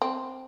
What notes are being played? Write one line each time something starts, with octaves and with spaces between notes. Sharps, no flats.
C4